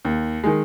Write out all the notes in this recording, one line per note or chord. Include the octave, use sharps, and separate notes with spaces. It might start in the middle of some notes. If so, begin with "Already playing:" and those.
D#2
D#3 G#3